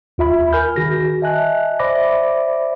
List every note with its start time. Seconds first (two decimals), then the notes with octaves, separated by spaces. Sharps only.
0.18 D#2 F4 E5 B5
0.53 A#4 G#5 B5 F6 G6
0.76 D#3 F#4 G#4 A#6
1.22 D#5 E5 G#5 A5 F#6
1.79 C5 D5 E5 B5 D6 A#6